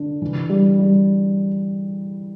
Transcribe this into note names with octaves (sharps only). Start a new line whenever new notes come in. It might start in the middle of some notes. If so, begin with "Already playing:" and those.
Already playing: D3
E3
G3
G3